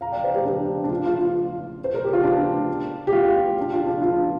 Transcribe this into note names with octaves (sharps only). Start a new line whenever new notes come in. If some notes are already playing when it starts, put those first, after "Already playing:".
F5 A#5
D5 G5
C5 F5
G4 C5
D4 G4
D4
F4
F4
F4
C5
A#4
G4
F4
D4
G4
F4
D4
F4
D4
F4